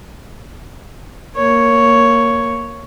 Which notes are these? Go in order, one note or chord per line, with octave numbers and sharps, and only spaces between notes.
A#3 C#5